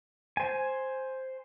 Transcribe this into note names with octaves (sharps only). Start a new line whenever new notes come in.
C5 G#5